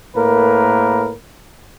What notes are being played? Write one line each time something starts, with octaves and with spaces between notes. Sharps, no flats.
A2 A#3 A#4 B4